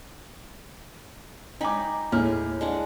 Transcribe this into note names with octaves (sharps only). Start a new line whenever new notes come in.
D#4 G5 G#5 A#5 B5 D6
D#2 A2 E4 G#4 F6
G#3 D4 F#5